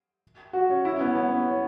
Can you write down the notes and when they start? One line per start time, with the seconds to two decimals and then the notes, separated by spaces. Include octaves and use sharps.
0.53 F#4
0.70 C#4
0.85 E4
0.96 C#4
1.00 B3
1.15 B3
1.32 C#4